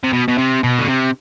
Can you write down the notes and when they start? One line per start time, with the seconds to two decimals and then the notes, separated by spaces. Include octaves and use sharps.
0.04 C3
0.13 B2
0.28 B2
0.38 C3
0.63 B2
0.79 D3
0.88 C3